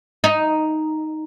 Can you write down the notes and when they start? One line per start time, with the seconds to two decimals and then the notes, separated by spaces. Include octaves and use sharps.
0.24 D#4